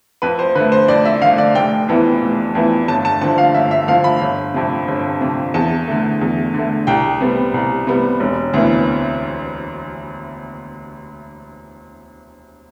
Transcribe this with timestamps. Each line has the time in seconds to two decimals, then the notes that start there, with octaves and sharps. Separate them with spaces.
0.22 F2 B4
0.39 C5
0.55 D3 B4
0.59 A3
0.72 C5
0.88 F2 D5
1.05 E5
1.22 D3 A3 F5
1.38 D5
1.55 F1 G5
1.88 F2 E3 B3
2.22 F1
2.55 F2 E3 B3
2.88 G1 A5
3.05 A5
3.21 F2 D3 F3 A5
3.38 F5
3.55 G1 E5
3.71 E5
3.88 F2 D3 F3 F5
4.04 B5
4.21 G1
4.54 F2 C3
4.88 G1
5.21 F2 C3
5.54 E2 A5
5.87 D3 A3
6.21 E2
6.54 D3 A3
6.87 C2 G5
7.20 C3 G3 B3
7.54 C2
7.87 C3 G3 B3
8.20 E1
8.54 D2 C3 E3 B3